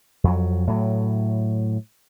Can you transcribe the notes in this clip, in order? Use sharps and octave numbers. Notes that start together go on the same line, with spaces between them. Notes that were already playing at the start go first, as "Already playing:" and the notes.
F2 F#3
A2 F#3